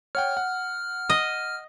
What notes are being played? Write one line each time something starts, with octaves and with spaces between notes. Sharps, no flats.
C#5 F#5 G5 F6
F#5
D#5